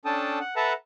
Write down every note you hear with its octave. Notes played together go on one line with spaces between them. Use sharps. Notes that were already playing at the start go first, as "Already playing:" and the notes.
C#4 D4 A4 G5 A5 D#6
F#5
A4 B4 E5 F#5 A5 A#5